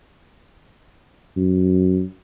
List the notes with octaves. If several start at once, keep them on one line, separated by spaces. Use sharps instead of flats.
F#2